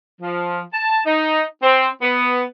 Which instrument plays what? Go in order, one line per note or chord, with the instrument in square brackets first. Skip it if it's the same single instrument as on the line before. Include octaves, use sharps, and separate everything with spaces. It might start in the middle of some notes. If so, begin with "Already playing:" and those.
[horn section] F3
A5
D#4
C4
B3